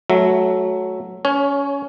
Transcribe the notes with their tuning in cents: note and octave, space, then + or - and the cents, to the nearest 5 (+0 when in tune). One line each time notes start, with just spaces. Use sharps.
F#3 +0 A3 -25 E5 +0
C#4 +20 C#5 +0